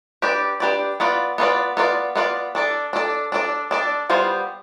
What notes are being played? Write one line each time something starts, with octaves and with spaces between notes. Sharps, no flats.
D4 G4 B4 D5
D4 G4 B4 D5
B3 F4 B4 D5
B3 F4 B4 D5
B3 F4 B4 D5
B3 F4 B4 D5
D4 A4 D5
D4 A4 D5
D4 A4 D5
D4 A4 D5
G3 B3 F4 C5